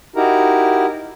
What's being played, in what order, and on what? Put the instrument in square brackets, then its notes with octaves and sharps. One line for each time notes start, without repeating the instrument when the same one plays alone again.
[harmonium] D#4 E4 F#4 G4 A#4 A#5